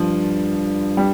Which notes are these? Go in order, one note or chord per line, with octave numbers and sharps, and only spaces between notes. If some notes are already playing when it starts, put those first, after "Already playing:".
Already playing: G2 F3
G3